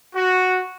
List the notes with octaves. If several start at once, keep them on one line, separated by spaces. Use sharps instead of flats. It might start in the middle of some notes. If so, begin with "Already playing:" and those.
F#4